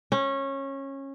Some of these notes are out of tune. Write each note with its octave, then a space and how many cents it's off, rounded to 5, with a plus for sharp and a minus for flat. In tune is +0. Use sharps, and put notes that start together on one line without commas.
C#4 -20